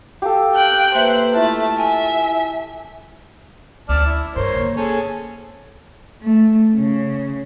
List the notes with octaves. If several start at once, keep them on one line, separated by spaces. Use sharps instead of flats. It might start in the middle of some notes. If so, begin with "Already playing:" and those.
G4 A4 F5
G5 F#6
A#3 B4 C5 E5
A3 E4 F4 A5
E5 G#5
D2 C#4 D5 A5 F6
E4
G2 A#4 C5 C#5
D3 A#3
C#4 G#4 A4
A3
C#3